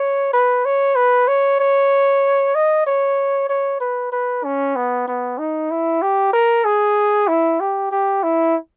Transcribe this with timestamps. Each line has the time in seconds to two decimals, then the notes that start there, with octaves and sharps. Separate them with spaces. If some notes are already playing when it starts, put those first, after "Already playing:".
Already playing: C#5
0.33 B4
0.65 C#5
0.96 B4
1.28 C#5
1.60 C#5
2.55 D#5
2.87 C#5
3.49 C#5
3.80 B4
4.12 B4
4.45 C#4
4.76 B3
5.08 B3
5.38 D#4
5.71 E4
6.02 G4
6.33 A#4
6.65 G#4
7.28 E4
7.60 G4
7.92 G4
8.23 E4